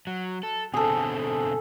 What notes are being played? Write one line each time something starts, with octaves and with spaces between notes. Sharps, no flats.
F#3
A4
B2 D3 C4 G#4 A4